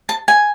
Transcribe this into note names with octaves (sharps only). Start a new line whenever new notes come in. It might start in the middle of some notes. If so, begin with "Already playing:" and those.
A5
G#5